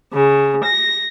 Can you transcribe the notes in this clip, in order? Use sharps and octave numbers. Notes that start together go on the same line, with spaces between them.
C#3
A#6